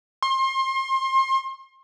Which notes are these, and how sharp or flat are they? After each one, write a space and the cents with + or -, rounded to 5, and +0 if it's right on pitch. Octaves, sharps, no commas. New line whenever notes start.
C6 +30